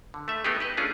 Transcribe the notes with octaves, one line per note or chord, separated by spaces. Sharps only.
D3
A3 E5
A3 B3 D#4 G4 G#4
G4 B4 D#5
A3 C#4 D4 F4 G#4